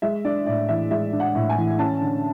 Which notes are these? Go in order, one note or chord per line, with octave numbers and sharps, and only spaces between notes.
G#3 E5
D4 D5
A2 D5
E3 E5
G#3 E5
D4
F#5
A2
G#5
E3
C#4 A5
D3